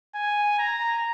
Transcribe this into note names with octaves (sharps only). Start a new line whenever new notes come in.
G#5
A#5